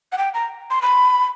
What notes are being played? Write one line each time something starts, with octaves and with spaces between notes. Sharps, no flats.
F#5
G5
A#5
C6
B5